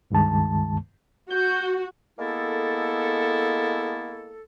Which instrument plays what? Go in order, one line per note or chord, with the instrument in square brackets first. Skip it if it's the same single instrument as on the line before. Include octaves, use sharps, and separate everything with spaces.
[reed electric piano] C#2 G2 D#3 G#3 A5
[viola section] F#4 [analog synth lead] G6
[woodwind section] G#3 A#3 B3 E4 A4